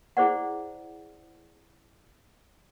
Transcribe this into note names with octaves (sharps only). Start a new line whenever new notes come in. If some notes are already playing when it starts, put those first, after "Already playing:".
E4 G#4 C5 D5 F#5